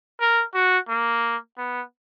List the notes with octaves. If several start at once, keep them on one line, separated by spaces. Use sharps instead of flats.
A#4
F#4
A#3
B3